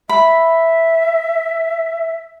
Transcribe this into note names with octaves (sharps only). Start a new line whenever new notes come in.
E5 B5